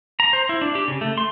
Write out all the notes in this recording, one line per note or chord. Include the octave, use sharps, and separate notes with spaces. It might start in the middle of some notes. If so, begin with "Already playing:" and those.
A#5
C5
E4
D4
G4
C#3
A3
C6